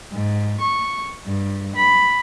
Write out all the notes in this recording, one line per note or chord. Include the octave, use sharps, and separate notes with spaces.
G#2
C#6
G2
B5